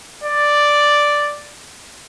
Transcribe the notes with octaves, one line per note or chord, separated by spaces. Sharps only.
D5